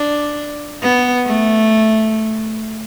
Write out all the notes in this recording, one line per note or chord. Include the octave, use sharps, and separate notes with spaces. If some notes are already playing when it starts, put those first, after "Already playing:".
Already playing: D4
B3
A3